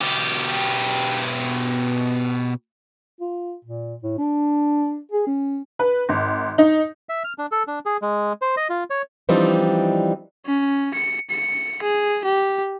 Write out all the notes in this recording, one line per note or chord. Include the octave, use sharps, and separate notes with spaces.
B2 G4
F4
A#2
A2
D4
G#4
C#4
B4
G#1
D#4
E5
F6
D4
A4
D4
G#4
G#3
C5
D#5
F4
C#5
E3 F3 G3 C4 D4 D#4
C#4
C#7
C#7
G#4
G4